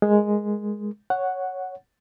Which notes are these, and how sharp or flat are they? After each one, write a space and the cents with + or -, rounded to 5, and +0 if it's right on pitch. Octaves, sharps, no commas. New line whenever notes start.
G#3 +0 A#4 +0
C#5 +0 F#5 +0